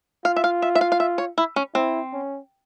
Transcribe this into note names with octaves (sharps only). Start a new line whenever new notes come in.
F4 F5
E5
F5
E5
E5
F5
F5
E5
C#5
E4
C#4
C4 E4
C#4